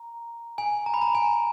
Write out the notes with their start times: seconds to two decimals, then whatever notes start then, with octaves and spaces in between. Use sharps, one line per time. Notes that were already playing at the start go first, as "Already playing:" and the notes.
Already playing: A#5
0.58 G#5
0.86 A#5
0.94 B5
1.02 A#5
1.15 G#5